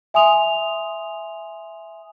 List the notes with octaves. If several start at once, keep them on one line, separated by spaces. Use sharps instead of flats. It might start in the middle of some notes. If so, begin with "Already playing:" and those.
E5 G#5 C6 D#6 F7